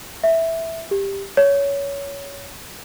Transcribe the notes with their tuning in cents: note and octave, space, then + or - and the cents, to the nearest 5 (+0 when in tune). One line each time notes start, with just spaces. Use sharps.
E5 -5
G4 +10
C#5 +15